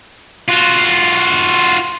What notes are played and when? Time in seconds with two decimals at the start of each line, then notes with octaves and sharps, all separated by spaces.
0.48 F4 F#4